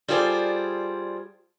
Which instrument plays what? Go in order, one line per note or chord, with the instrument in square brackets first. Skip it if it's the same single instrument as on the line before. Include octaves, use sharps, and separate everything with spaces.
[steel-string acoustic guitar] G3 F4 G#4 A4 C5 D5